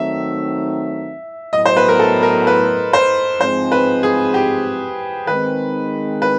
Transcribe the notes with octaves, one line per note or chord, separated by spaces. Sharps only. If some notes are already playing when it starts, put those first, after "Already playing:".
Already playing: D#3 F#3 A3 C4 D#4 E5
A2 F#3 B3 D#5
C5
B4
A#4
A4
A#4
B4
C5
G#2 F3 G#3 C4 C5
B4
G#4
G4
D#3 G#3 C4 B4
B4